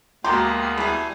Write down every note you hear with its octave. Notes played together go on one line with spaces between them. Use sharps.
D2 G#3 A#3 B3 F#4 G4 A#5 C6
E3 G3 A3 G#4